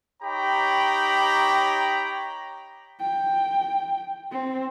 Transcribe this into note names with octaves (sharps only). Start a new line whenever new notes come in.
D#4 G4 C#5 G5 A#5 B5
G5
C4